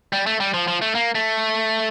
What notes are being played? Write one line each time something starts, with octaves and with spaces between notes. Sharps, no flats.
G3
A3
G3
F3
F3
A3
A#3
A3